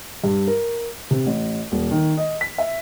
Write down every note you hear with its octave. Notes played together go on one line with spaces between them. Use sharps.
G2
A#4
C3
A1
D#1
D#3
D#5
B6
E5